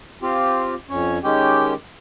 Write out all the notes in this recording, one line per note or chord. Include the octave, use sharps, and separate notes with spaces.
C4 F4 G4
F2 C#4 C#5
D#3 G#3 C#4 G4 G5